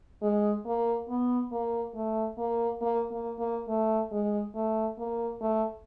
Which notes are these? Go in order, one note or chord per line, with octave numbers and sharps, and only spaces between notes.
G#3
A#3
B3
A#3
A3
A#3
A#3
A#3
A#3
A3
G#3
A3
A#3
A3